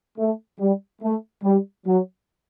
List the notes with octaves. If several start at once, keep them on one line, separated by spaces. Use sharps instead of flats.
A3
G3
A3
G3
F#3